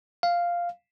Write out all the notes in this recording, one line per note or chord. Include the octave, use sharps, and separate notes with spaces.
F5